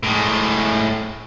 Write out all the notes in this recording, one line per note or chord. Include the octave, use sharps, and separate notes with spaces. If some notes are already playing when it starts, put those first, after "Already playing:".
A2 G#3